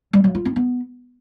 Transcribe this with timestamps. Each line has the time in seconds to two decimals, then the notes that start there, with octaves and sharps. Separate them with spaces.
0.13 G3
0.24 F#3
0.35 F4
0.45 C4
0.56 B3